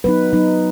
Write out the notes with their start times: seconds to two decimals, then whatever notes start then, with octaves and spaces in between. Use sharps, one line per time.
0.04 F#3 B3 D#4 B4
0.33 F#3 B3 D#4